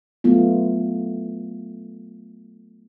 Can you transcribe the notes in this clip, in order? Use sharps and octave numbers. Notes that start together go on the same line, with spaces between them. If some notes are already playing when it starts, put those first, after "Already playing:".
F#3 A3 B3 F4